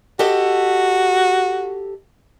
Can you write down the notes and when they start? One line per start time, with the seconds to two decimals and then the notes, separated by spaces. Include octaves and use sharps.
0.19 F#4 G4 A4 D#5